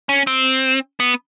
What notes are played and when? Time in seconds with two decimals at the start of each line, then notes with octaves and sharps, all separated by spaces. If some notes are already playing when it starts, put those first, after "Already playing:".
0.09 C#4
0.27 C4
1.00 B3